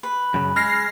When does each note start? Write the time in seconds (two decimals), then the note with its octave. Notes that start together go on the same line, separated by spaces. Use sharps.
0.03 B4
0.34 F#2 C#3
0.56 G#3 F6 A#6 C7